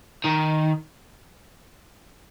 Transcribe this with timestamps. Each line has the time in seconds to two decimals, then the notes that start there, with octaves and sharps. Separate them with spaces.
0.24 D#3